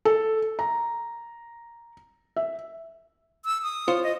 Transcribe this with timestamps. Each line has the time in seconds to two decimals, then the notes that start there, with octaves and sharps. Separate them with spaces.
0.05 A4
0.59 A#5
2.37 E5
3.45 E6
3.63 D#6
3.88 F4 C5 C#5
4.04 D#5